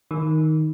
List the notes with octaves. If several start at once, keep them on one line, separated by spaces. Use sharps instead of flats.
D#3